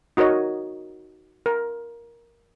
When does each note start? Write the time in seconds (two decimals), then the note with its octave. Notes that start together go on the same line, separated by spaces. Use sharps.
0.17 D#4 F#4 A#4 C#5 D#5
1.46 A#4